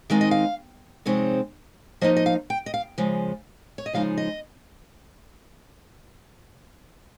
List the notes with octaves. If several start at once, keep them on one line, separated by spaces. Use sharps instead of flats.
D#3 G#3 C4 D#4 F5
D#5
F5
C3 F3 G#3 C4 D#4 C#5
F3 A#3 D#4 D#5
D#5
F5
G5
D#5
F5
C#3 F3 G#3
C#5
D#5
C#3 F3 G#3 D#4 F5
D#5